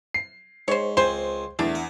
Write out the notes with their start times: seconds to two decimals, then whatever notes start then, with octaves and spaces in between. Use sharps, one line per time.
0.14 C7
0.68 G#2 C5 C#5
0.97 C#2 C4 C5 G5 G#5 C6
1.59 E2 A3 D4
1.75 F#5